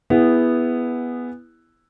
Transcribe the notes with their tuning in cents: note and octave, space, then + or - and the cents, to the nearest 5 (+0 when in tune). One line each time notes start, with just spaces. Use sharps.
B3 +0 E4 +0 G#4 -20